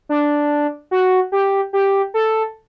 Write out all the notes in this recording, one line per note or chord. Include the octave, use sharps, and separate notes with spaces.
D4
F#4
G4
G4
A4